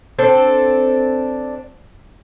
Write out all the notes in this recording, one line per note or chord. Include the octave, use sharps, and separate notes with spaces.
C4 D4 A4